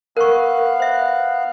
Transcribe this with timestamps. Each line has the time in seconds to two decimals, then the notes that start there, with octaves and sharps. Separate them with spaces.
0.17 B3 A#4 F5 C#6 F#6
0.80 C5 E5